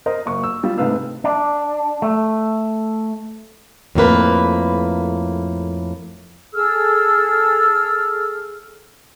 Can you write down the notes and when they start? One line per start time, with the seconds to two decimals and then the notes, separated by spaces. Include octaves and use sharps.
0.06 A#4 C5 D#5
0.26 F#1 C#6
0.43 E6
0.63 G3 F4
0.78 G#2 C3 A3 B4 F5 E6
1.24 D4
2.02 A3
3.95 F2 A2 A#3 B4
6.54 G#4 A4 E6 F6